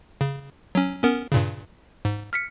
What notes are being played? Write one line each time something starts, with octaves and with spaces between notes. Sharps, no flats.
C#3
F#3 C#4
B3 C#4 A#4
G2 A#2 C#3
G#2
F6 B6 C#7